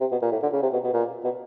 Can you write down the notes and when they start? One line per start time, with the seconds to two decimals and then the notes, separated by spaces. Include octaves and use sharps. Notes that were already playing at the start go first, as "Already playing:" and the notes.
0.01 C3
0.12 B2
0.22 A#2
0.32 A2
0.43 D3
0.53 C#3
0.63 C3
0.73 B2
0.84 B2
0.94 A#2
1.24 B2